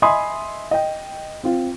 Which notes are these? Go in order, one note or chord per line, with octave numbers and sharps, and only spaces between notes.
D#5 E5 G#5 B5 C6 D#6
D#5 G5
C4 F4